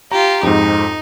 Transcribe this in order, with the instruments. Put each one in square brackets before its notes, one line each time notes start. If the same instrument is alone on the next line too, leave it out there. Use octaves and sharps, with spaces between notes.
[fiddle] F4 G4 [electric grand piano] A#5
[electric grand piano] F2 G#2 [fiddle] D#4